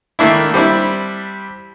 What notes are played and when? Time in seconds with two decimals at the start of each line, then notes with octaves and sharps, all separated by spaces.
0.19 D#3 A3 A#3 D4 E4
0.54 G3 C4 D4 E4